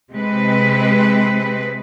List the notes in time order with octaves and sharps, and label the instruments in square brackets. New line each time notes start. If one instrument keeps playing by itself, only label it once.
[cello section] C3 G#3 C4 B4